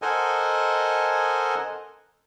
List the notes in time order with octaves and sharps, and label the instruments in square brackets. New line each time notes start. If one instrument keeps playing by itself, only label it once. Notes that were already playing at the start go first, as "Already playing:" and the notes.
[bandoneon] A4 A#4 C5 D#5 F#5 G#5